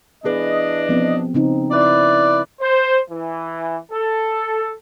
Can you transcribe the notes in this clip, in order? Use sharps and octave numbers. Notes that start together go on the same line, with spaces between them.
E3 B3 D4 G#4 B4 D#5
F3 B3 C4
C#3 C4 D#4
E4 B4 D5
C5
E3
A4